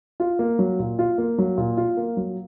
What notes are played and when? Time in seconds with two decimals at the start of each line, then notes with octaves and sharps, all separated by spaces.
0.20 F4
0.39 A#3
0.59 F#3
0.79 A#2
0.99 F4
1.18 A#3
1.38 F#3
1.58 A#2
1.77 F4
1.97 A#3
2.17 F#3